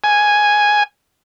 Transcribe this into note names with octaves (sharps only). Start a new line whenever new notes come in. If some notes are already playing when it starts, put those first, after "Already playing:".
G#5